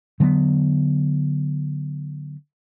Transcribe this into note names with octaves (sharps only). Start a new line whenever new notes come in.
D3 F#3 G3 B3